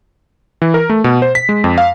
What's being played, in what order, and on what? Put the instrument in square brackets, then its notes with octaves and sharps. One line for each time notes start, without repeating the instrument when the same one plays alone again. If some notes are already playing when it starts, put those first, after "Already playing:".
[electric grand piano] E3
A#4
A3
B2
C5
B6
G#3
F2
F5